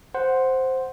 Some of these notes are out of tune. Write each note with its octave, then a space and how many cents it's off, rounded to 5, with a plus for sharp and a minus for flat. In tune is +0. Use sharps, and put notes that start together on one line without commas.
C5 +0 F#5 +0